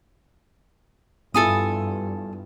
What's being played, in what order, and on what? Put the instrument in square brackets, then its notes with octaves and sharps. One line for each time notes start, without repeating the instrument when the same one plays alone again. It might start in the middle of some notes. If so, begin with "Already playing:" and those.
[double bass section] G2 [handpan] B3 E4 F4 [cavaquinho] A4 G#5 D#6